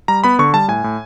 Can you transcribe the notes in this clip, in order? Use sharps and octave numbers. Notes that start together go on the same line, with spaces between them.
G3 A#5
B3 B5
D3 C#6
G3 A5
A2 G#5
A2